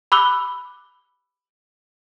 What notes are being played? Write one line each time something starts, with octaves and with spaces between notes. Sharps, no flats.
B5 D6 E6 F#6 G7